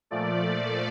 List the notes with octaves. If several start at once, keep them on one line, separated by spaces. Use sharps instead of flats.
A#2 F3 A3 D5